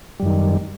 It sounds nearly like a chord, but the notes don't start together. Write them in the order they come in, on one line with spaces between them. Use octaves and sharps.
G3 F#2 D#3